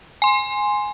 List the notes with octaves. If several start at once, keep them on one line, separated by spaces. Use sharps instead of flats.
G#5 C6